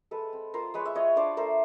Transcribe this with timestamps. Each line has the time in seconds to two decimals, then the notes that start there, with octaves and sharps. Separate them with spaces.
0.11 G#3 A4 B4
0.33 C4
0.54 F4 A#4 C5
0.74 G#3 B4 C#5
0.85 E5
0.95 F4 C#5 D#5
1.16 D4 C5 D5
1.37 A3 A#4 C5